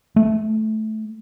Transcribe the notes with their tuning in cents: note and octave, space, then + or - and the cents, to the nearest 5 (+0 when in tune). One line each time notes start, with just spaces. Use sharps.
A3 -15